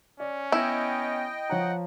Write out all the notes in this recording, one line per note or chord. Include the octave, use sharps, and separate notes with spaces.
C#4 D5
B3 E4 D#5 G5
F3 C#5 F#5 A#5